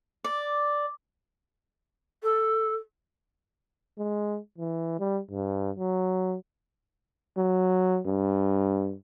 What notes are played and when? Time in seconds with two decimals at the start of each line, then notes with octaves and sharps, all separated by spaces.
0.24 D5
2.23 A4
3.99 G#3
4.58 E3
4.99 G3
5.31 G2
5.77 F#3
7.37 F#3
8.06 G2